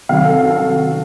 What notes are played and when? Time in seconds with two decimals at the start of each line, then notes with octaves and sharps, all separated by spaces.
0.09 C3 D#3 F#3 F5
0.25 A4
0.41 F#4
0.50 A4
0.56 F#4